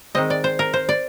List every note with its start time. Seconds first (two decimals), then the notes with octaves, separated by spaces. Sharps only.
0.15 D#3 G#3 C4 D#5
0.30 D5
0.44 C5
0.59 A#4
0.73 C5
0.89 D5